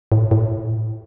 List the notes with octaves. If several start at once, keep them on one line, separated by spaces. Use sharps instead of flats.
A2
A2